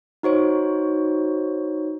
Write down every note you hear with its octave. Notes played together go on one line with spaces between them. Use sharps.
D#4 F#4 C5 C#5